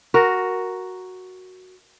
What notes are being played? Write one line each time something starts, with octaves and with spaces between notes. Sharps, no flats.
F#4 A#4